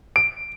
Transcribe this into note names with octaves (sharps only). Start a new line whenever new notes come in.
D7